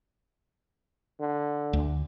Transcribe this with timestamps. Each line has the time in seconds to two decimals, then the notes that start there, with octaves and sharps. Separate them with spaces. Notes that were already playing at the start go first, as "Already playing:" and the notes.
1.20 D3
1.73 D2